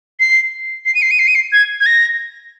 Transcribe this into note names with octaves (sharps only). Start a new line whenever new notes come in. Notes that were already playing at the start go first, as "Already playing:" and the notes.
C7
C7
D#7
C7
D#7
C7
D#7
C7
G#6
G#6
A#6